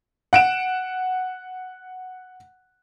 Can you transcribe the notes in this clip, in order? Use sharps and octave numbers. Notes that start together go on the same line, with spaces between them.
F#5 D7 E7